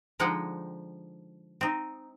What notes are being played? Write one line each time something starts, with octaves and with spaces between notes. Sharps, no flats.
D3 F3 G#3 D#4 F#5 G5
C4 D#4